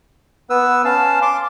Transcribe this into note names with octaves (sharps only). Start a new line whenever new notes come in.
B3 B4 E6
C#4 F5 A5
C6 D6